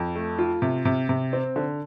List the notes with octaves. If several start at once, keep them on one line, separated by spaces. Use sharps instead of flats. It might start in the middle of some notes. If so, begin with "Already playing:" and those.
Already playing: F2
A3
F4
C3
C3
C3
C4
D3